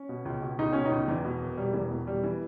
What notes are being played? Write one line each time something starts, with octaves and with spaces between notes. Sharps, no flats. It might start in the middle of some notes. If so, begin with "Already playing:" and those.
Already playing: C#4
B2
C#2
B2
C#2 D#4
B2 C#4
D#4
C#2
E2 E3
B2
E1
E1 G3
E2 E3
B2
E1 G3
E3